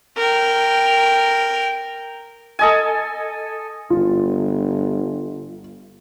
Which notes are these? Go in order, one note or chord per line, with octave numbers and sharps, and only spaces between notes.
A#4 G5
A4 D#5 G#5
G1 F4